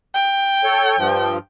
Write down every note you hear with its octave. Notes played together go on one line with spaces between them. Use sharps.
G5
A4 C#5
G2 F3